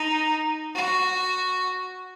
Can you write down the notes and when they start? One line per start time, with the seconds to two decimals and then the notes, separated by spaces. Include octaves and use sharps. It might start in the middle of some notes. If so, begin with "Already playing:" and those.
Already playing: D#4
0.75 F#4